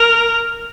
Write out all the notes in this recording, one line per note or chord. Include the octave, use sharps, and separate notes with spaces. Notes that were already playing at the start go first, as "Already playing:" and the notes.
Already playing: A#4